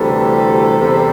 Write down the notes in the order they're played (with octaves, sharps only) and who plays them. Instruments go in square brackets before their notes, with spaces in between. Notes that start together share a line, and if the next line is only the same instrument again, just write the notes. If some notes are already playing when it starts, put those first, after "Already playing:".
Already playing: [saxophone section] D2 C3 E3 G3 A4
E2 C3 G3